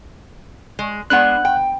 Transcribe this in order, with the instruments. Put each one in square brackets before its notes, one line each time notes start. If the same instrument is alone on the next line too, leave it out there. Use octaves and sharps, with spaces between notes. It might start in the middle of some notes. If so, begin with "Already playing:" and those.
[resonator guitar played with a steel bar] G#3
[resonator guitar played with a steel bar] G#3 B3 D4 [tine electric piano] F#5 F#6
[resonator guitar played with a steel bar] G5